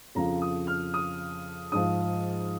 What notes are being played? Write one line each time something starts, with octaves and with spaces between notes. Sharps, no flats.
F2 C#3 F3 A#5
D#6
F6
D#6
G#2 F3 D#6